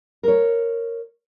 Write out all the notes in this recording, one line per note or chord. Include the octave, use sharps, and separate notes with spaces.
A#4 C#5